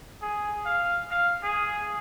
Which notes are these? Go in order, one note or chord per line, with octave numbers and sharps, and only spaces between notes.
G#4
F5
F5
G#4